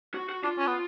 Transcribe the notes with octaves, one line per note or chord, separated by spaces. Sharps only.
F#4
F#4
D4 F4
C#4
B3